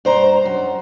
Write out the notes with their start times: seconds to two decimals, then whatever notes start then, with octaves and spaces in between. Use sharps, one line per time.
0.05 G2 C5 A#5
0.45 F#2